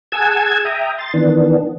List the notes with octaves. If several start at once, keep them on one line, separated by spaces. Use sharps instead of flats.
G#4 F#5 G#5 A5 E6 G#6
E5 G5 A#5 D#6
C6 A6
D#3 E3 B3 D4